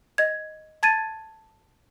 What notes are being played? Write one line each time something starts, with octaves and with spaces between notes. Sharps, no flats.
D#5 G#6
A5 G#6 A6 D#7